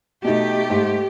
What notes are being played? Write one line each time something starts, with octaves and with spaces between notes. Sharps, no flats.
B2 A3 D#4 G4
G#2